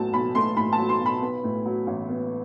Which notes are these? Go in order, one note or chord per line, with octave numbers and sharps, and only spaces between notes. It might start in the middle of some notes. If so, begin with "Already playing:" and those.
Already playing: B1 A2 F#3 A3 A5
B1 B5
A3 C6
A2 B5
A5
F#3
C6
B1
B5
B3
A2
F#3
A1
B3